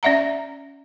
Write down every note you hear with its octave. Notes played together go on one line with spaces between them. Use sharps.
C#4 D5 E5 F#5 A#5